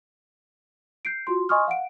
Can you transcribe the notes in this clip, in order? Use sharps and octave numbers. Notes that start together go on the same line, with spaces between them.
G6 C7 D7
F4 F#4 C6
D#5 G#5 C6 C#6 D#6 F6
F5 F#5 D7